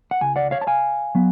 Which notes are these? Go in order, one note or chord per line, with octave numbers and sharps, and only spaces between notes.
F#5
C#2 C#3 G#5
D5 F#5
C#5 F5
A5
F5 G#5
F#3 B3